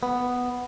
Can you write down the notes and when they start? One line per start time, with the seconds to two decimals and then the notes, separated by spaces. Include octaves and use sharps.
0.03 B3